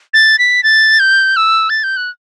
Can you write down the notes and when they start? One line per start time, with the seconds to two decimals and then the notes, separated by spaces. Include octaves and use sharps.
0.14 A6
0.39 B6
0.63 A6
1.00 G6
1.36 E6
1.70 A6
1.84 G6
1.97 F#6